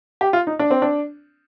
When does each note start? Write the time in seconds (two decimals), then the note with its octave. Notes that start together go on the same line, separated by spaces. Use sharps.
0.21 G4
0.33 F4
0.47 D#4
0.59 D4
0.70 C4
0.82 D4